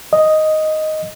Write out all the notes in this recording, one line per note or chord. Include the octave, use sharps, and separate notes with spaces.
D#5